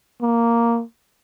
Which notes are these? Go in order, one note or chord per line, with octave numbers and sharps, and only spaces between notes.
A#3